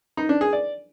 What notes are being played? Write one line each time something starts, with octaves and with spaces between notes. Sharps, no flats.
D#4
D4
G#4
D5